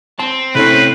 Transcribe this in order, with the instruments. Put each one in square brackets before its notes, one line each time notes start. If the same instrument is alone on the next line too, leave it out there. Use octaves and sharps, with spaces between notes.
[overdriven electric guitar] C4 [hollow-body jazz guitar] A5
[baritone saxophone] A2 [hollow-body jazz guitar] C3 C#4 [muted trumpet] B4